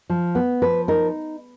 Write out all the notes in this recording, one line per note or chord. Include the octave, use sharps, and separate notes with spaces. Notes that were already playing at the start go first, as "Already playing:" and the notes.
F3
B3
F3 B4
D#4 A#4